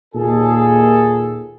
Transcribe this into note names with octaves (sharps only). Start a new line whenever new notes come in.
D#2 A#2 G#4 A4